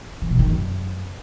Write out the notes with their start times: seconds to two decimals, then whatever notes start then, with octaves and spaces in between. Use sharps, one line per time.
0.22 E3
0.30 B2
0.39 D#3
0.48 F#2